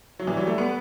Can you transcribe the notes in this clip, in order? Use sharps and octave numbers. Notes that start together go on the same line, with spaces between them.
F#3
E3 G3
F#3
A3
B3